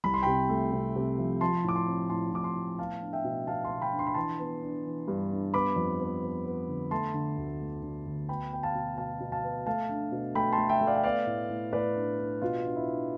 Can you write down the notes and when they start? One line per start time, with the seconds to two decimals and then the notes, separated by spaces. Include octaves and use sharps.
0.04 C2 B5
0.14 C6
0.22 C3 G5 B5
0.49 A3
0.73 C3
0.95 C3
1.18 F3
1.41 F3 A5 C6
1.64 A2 D6
1.76 A5 C6
1.87 C4
2.10 A2 A5 C6
2.33 A2 D6
2.44 A5 C6
2.56 A2
2.79 B3 F5 A5
3.02 D4
3.13 E5 G5
3.24 B2
3.47 B2 F5 A5
3.64 A5 C6
3.70 B2
3.82 G5 B5
3.93 D4
3.99 C6
4.07 B5
4.14 E3 A5 C6
4.39 B3
4.62 D4
4.85 E3
5.08 G2
5.31 D4
5.53 B3 B5 D6
5.76 F2
6.00 B3
6.23 B3
6.46 B3
6.68 D3
6.91 A3 A5 C6
7.14 D3
7.37 D2
7.60 A3
7.83 D3
8.06 D2
8.28 B3 G5 B5
8.52 B3 G5
8.63 F5 A5
8.75 B2
8.98 B2 F5 A5
9.20 B2
9.32 F5 A5
9.44 B3
9.66 A3 F5 A5
9.89 D4
10.12 B2
10.35 A3 G5 B5
10.52 A5 C6
10.58 A3
10.69 E5 G5
10.81 A3
10.87 D5 F5
10.95 G5
11.04 B3 D5 F5
11.27 A2
11.50 A2
11.73 A2 B4 D5
11.95 D4
12.19 D4
12.42 B2 F4
12.65 D4
12.76 E4
12.88 D4